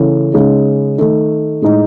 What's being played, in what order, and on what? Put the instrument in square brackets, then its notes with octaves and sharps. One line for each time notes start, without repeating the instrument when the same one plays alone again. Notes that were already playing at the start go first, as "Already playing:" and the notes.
Already playing: [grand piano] C#3 E3 A3 E4
C#3 G#3 D#4
D#3 A3 D#4
A2 G#3 D#4